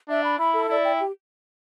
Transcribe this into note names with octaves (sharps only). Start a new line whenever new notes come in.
D4 E5
B5
E4 B5
A4
E4 D5
G5
G4